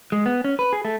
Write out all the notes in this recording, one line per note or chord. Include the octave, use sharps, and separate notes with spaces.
G#3
B3
C#4
B4
G#4
A3